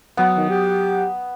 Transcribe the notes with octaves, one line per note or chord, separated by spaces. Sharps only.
F#3 B3 F#5
D#3
G4